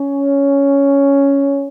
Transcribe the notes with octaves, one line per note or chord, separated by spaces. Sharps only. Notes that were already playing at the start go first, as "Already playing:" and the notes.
Already playing: C#4